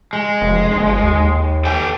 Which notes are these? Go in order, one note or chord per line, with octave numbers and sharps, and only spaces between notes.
G#3
F1
G1
D#2
A4 G5 G#5